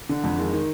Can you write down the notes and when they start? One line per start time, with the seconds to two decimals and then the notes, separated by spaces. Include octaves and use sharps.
0.09 D3
0.24 F2
0.38 D#3 G#3
0.53 D#3